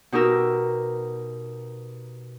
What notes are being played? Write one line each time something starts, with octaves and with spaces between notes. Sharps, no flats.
B2 D#4 G4 A#4 E6